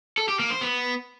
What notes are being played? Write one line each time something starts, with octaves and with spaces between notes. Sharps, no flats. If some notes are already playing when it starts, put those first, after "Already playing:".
A4
G4
A#3
C5
B3